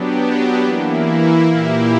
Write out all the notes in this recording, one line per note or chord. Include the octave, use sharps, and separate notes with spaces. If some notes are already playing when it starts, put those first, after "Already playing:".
Already playing: F#3 B3 D4 G4
E3 A#3 E4
A#2 A#3 E4 G4